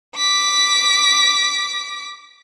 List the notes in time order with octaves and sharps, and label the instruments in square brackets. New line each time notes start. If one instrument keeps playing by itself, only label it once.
[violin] D6 B6